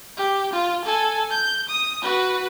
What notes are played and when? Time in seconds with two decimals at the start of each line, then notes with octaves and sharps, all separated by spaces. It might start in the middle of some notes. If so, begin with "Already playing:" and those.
0.17 G4
0.53 F4
0.85 A4 G#5
1.31 G6
1.68 D#6
2.03 F#4 B4